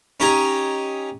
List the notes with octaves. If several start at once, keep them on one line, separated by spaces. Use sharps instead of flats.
C#4 D#4 G4 D#5 G#5 A#5